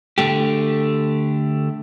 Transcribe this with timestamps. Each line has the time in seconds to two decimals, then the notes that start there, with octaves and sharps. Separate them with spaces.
0.18 D3 A3 G4